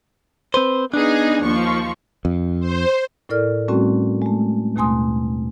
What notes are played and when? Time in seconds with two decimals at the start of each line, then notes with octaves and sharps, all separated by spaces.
0.54 C4 B4 C5
0.94 B3 D4 D#4 G#4
1.43 D#2 F3 C#6
2.25 F2
2.60 C5
3.29 A2 E4 A4 A#4 D5 F6
3.68 A2 G3 A3 C4 C#4 F#4
4.22 G#3 A3
4.76 D#2 B2 A3 G#5 C6 D#6